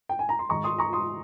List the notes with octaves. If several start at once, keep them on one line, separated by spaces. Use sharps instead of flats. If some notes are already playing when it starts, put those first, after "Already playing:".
G5
G#5
A#5
C6
G#2 D#3 A#5 C#6
C6 D#6
A#5 C#6
C6 D#6